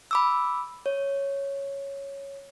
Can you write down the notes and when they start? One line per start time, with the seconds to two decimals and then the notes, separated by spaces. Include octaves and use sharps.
0.11 B5 D6 E6
0.86 C#5